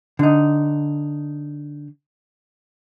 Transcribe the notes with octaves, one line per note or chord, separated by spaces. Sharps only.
D3 D#4